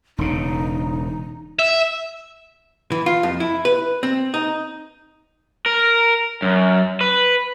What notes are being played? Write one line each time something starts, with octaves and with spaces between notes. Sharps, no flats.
E1 C#3 D#4
E5
E3
F4
F2
E4
B4
C4
D#4
A#4
F#2
B4